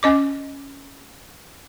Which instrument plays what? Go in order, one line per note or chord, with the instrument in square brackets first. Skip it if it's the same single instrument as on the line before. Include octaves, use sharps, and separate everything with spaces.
[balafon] C#4 D#5 D6